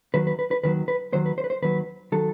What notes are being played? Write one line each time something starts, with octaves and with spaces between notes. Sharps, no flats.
D#2 D#3 F#3 B4
B4
B4
B4
D#2 D#3 F#3 B4
B4
D#2 D#3 F#3 C5
B4
C5
B4
C5
D#2 D#3 F#3 B4
D#3 F#3 A4